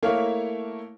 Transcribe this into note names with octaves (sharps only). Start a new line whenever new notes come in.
A3 A#3 E4 A#4 C#5 F5